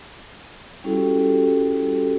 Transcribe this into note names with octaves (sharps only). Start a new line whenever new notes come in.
G3 C#4 E4 F#4 G4 A4